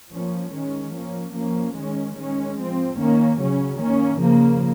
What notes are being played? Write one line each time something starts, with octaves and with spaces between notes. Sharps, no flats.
F3 A#3 C#4
D#3 G#3 C#4
F3 A#3 C#4
F3 A#3 C#4
D#3 G#3 C#4
D#3 G#3 C#4
F3 C4
D#3 A#3 C#4
C#3 F#3 C#4
D#3 A#3 C#4
C#3 F3 A#3